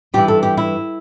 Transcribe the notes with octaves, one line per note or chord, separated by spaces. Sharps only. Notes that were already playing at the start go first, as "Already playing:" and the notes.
G2 E3 G4
A4
G4
E4